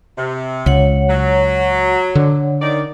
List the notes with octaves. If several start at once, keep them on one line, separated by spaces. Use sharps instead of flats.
C3
C#2 C#5 F#5
F#3
D3
D#3 D5